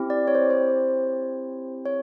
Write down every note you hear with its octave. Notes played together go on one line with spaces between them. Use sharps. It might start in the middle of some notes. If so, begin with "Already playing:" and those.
Already playing: C4 E4 G4
D5
C#5
C5
C5
C#5